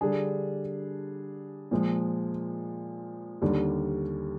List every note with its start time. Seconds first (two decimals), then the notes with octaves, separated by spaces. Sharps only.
0.01 D3 G3 D4 G#4
1.71 A#2 F3 G#3
3.41 D#2 D3 G3